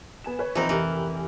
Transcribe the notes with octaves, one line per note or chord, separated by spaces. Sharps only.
B3 G#5 E7
B4 C#5
E3 F3 C4 D#4 B4
F1 E3 G4 A#4